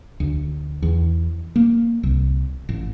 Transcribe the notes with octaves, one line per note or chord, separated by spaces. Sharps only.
D2
E2
A#3
C2
A1